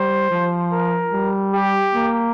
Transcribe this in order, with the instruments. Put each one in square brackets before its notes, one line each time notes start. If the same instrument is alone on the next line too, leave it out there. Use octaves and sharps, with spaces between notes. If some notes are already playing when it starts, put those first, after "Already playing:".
Already playing: [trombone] G3 [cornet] C5
[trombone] F3
[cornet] A#4
[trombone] G3
[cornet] G4
[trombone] A#3